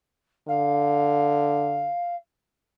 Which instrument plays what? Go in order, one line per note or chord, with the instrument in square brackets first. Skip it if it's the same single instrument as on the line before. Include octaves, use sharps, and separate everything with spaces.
[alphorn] D3 [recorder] F5